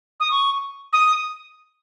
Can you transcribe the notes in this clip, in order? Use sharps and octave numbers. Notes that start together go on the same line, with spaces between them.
D#6
C#6
D#6